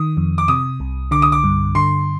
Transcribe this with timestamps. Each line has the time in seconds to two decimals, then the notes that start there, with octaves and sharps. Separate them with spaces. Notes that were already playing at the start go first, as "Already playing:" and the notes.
Already playing: D#3 D#6
0.17 F2
0.38 D6
0.48 C3 D#6
0.80 C2
1.11 D3 D6
1.22 D#6
1.32 D6
1.44 G2
1.75 D3 C6